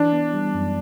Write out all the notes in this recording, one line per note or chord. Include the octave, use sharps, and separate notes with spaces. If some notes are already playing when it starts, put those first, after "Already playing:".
Already playing: E3 D4
B3
G3
F#2